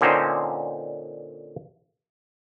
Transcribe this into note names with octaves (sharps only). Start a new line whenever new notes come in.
A#2 D3 C4 C#4 D#4 C5